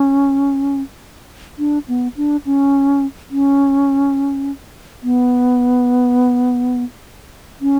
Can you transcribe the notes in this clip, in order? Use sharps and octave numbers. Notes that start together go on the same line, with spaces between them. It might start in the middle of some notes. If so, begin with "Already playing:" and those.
Already playing: C#4
D4
B3
D4
C#4
C#4
B3
C#4